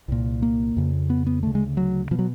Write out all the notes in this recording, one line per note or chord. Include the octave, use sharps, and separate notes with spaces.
C2 A#2
A#3
F2 C#3
B3
B3
D2 C#3 A3
G#3
F#3
B2 F3
F#3